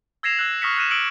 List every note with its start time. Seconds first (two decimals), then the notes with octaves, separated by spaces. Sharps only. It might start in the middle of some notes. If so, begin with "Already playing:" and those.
0.23 E6 G#6 A#6 C7 E7 F7
0.37 E6 F#6 F#7
0.62 C#6 D#6 F6 A#6 B6 C#7
0.77 F6 F#6 A#6 C7 D#7 E7
0.91 D6 E6 F6 C#7 D7 F#7